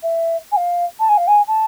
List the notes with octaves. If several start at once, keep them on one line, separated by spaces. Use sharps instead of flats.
E5
G#5
F5
A5
G#5
F5
G#5
A5